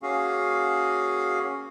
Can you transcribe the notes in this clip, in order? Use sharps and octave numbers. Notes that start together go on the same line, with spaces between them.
A#3 C#4 F#4 G#4 F5